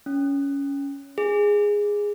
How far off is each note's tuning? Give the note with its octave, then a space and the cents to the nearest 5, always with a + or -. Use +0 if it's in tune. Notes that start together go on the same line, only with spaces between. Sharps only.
C#4 +15
G#4 -10